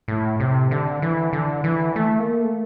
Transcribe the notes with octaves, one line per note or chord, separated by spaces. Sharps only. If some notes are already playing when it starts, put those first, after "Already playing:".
A2
C3
D3
E3
D3
E3
A3
A#3
A3